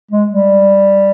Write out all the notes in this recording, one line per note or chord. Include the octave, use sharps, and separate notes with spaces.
G#3
G3